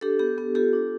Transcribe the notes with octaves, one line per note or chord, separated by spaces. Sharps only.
D4 G4 A4
B3 G4
B3 G4
F4 G4 A4
D4